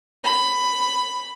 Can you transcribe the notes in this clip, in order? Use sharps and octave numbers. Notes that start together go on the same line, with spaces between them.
B5